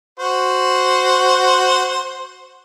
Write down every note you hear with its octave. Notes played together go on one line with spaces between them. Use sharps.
F#4 C5